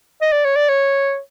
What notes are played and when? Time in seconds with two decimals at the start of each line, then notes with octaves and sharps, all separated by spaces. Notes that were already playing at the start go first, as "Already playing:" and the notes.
0.22 D#5
0.32 D5
0.45 C#5
0.56 D5
0.69 C#5